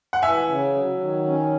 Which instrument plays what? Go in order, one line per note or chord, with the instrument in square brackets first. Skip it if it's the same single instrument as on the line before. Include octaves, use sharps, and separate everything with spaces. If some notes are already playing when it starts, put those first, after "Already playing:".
[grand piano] F#5
[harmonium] E3 [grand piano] E5 G#5
[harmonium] C#3
F#3
D#3
C#4